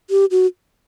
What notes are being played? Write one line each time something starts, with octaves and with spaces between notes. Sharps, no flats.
G4
F#4